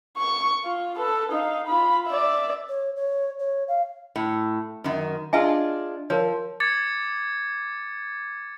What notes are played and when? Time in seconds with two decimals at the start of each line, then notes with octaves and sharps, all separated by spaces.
0.18 C#6
0.65 F4
0.97 A4 B4
1.33 D#4 F5
1.68 F4 B5
2.07 D5 E5
2.68 C#5
2.96 C#5
3.39 C#5
3.68 F5
4.16 A2
4.84 F#2 D#3
5.33 D4 F4 G#4 D#5 E5 G#5
6.10 F3 A#4 C#5
6.60 D6 G#6 A6 C#7